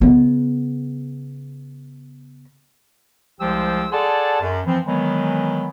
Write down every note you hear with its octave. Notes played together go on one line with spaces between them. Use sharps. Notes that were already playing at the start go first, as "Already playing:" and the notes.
C#3 B3
C2 F3 G#3 G4 C5 E6
G#4 A4 D5 F#5 A5 C6
F#2
E3 F3 C4
D#3 E3 F#3 G#3 B3